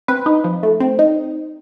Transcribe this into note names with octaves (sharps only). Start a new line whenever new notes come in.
C4 B4
D#4
F3
A3
C4
D#4